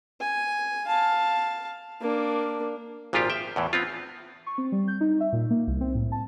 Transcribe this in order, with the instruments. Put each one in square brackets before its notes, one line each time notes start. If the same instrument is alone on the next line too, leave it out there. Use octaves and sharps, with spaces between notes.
[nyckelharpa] G#5
F5 A5
A#3 D4
[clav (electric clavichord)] G#1 A#2 F3 F4 G4 F5
E5 G5
E2 A2 E3
B3 C4 F4
[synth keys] C#6
C4
G3
G6
D#4
E5
A#2
A#3
C2
C4
A2
A5